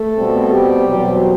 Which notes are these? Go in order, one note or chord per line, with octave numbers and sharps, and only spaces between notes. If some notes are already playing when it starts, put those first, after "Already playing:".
Already playing: A3 A4
B2 G3 C4
G3 G4
E2 B2 F#3 C4